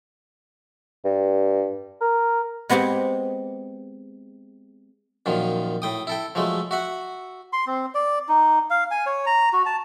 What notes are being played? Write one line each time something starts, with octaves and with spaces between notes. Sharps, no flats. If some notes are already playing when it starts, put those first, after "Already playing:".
G2
A#4
G#3 B3 C4 G4 G#4
F#2 A#2 D#3 F3
A2 G5 D#6
E4 A4 G5
F3 F#3 G#3 A3
F#4 E5 F#5
C6
C4
D5
D#4
F5
G#5
C#5
A#5
F#4
A5